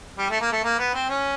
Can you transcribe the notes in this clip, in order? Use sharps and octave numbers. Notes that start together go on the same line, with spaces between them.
G3
A3
A#3
A3
A#3
B3
C4
C#4